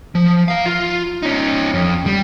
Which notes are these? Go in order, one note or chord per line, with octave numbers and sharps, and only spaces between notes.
F3
A#4 F5
F4
C#4 D#4
F2
G3